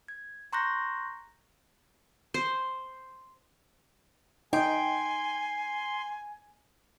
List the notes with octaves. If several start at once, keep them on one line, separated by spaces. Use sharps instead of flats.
G#6
A#5 C6 C#6 F#6 G6 A#6
C5
D#4 G5 G#5 C6